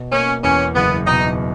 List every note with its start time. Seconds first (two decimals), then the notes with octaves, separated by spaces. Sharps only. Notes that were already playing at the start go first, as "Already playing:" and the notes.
Already playing: B2
0.12 A#3 C#4
0.44 E2 C#4
0.75 F#1 B3
1.07 B2 D#4